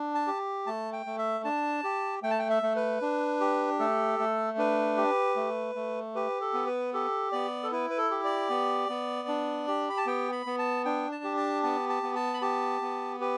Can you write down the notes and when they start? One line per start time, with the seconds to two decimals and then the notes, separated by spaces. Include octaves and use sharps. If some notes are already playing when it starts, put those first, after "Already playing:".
Already playing: D4
0.15 A5
0.27 G4
0.67 A3 A5
0.93 G5
1.06 A3
1.18 E5
1.44 D4 A5
1.84 G4
2.23 A3 G5
2.31 A5
2.39 G5
2.50 E5
2.63 A3
2.76 B4
3.02 D4
3.40 G4
3.79 A3 A4
4.19 A3
4.58 D4 B4
4.97 G4
5.36 A3
5.75 A3
6.15 G4 B4
6.41 A4
6.54 B3
6.67 B4
6.93 G4 A4
7.32 B3 D5
7.63 A4
7.72 E4 B4
7.90 B4
7.97 A4
8.11 G4
8.24 D5
8.50 B3
8.89 B3
9.28 D4
9.68 G4
9.89 B5
9.97 A5
10.06 B3 G5
10.32 B5
10.46 B3
10.59 A5
10.85 D4 G5
11.12 A5
11.24 G4
11.37 A5
11.63 B3 A5
11.89 A5
12.03 B3
12.15 A5
12.34 B5
12.42 G4 A5
12.81 B3
13.20 G4 B4